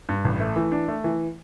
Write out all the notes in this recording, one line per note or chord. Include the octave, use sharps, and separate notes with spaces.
G2
A1
A3
E3
D4
A3
E3